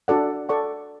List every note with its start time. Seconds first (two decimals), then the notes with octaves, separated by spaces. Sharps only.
0.08 D4 F#4 A4 D5 F#5
0.49 A4 D5 F#5 C#6